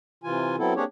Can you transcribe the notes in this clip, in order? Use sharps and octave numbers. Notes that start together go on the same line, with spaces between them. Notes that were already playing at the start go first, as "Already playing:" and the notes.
C3 E3 F4 G#5
F#3 B3 C4 E4 A4
A#3 C4 D4 G4 G#4 C#5